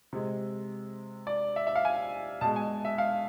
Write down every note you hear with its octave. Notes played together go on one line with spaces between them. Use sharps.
C3 G#3
D5
E5
E5
F5
G#5
B2 G#3 A5
G#5
E5
F5